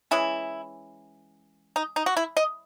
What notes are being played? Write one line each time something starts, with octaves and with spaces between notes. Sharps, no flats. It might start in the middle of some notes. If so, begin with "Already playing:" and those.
E3 G#3 C#4 E4
D#4
D#4
F#4
E4
D#5